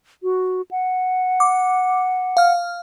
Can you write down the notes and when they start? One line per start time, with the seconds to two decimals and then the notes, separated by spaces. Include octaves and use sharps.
0.23 F#4
0.71 F#5
1.40 D6
2.37 F5 F6